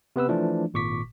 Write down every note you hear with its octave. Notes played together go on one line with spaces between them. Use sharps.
C3 B3 B4 E6
E3 F3 A3 D4
G#1 A#2 C#6 D6 B6